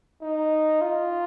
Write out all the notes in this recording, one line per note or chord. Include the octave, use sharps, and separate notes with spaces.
D#4
F4